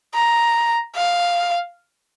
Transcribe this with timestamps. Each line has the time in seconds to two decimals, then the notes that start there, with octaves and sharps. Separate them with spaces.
0.14 A#5
0.96 F5